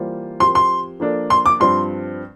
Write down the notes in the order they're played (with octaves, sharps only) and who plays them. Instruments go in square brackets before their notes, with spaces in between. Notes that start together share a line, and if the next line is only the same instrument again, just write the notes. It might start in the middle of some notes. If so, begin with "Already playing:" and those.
Already playing: [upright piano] E3 G3 A#3 F4 C5
[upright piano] F3 C4 G4 A#4 [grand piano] C6
[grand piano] C6
[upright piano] F3 A#3 D4 A4
[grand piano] C6
D6
[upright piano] G2 F3 C4 [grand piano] C6